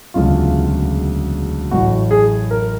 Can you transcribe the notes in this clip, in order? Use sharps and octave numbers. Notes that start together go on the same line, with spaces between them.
E1 D2 C#3 F#3 F4
A1 A2 F#3 F#4
G#4
A#4